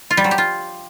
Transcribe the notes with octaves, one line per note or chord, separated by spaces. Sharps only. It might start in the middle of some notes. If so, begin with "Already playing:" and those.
F4
G3
F#3
G4
F4